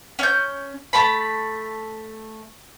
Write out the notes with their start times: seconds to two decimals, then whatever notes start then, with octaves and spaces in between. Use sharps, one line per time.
0.19 C#4 G6
0.93 A3 A5 B5